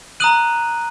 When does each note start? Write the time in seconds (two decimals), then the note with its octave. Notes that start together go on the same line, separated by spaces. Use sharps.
0.20 A#5 D#6 F#6 D#7 F#7